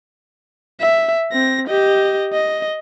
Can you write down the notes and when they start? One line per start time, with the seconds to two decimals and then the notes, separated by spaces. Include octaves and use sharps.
0.81 E5
1.33 C4 A#6
1.68 G4 D#5
2.33 D#5